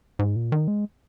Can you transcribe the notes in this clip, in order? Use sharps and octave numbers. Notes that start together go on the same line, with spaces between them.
G#2
A#2
D#3
G#3